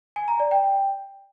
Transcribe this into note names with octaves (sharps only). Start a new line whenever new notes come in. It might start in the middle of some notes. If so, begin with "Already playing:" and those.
G#5
A#5
D5
G5